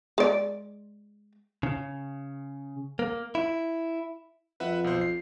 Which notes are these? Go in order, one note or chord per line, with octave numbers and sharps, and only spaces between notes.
G#3 D5
C#3
A#3
E4
F2 B4 E5 F#5
B1 C5
C7